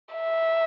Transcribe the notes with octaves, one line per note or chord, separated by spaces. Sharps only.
E5